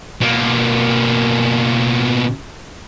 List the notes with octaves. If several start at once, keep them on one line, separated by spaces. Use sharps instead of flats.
B2 A#3